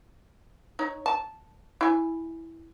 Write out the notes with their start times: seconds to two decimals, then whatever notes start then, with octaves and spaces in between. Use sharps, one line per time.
0.79 D#4 C#5
1.06 A5
1.81 E4 G#5